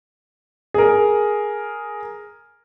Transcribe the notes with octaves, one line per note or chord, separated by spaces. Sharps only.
G#4 A#4